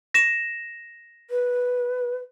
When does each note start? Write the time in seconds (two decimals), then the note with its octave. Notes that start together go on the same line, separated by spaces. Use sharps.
0.14 A#6 E7
1.30 B4